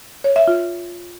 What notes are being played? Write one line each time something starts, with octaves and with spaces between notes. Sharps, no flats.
C#5
E5
F4